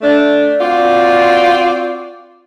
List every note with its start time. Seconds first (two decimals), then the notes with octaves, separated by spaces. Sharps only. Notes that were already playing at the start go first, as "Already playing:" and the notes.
0.01 A3 D4
0.61 C4 F4 F#4 D5